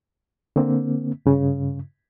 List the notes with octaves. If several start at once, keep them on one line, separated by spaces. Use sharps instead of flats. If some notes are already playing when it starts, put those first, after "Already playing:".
D3 A#3 C4
G2 C#3